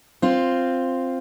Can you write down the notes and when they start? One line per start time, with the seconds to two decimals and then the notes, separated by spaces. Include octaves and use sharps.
0.22 C4 F4